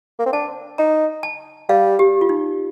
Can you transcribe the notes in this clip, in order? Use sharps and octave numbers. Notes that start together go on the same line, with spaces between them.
A#3
C4
D4 A5
D#4 A#5
A5
G3 F5
G4
F4
D#4